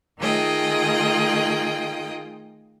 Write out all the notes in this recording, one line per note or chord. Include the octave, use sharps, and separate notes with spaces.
D#3 A3 F4 G#4 D#5 G5